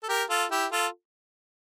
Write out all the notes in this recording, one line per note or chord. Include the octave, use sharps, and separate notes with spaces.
A4
G4 A#4
F4 A4
E4 G4
F4 A4